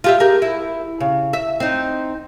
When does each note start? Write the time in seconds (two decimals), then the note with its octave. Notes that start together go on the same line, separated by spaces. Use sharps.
0.04 F4 G4 E5
0.20 G4 G#4 A#4
0.42 E4
1.00 C#3
1.33 E5
1.60 C4 D#4